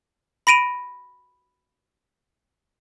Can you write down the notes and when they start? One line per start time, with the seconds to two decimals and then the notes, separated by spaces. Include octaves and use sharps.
0.47 B5 A#6 D7 D#7 F7